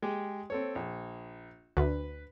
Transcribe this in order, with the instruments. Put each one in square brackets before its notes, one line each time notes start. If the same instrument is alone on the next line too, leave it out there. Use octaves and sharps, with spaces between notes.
[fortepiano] G#3 G4 G#4
C4 A4 C#5
A#1
[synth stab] D2 [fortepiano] B4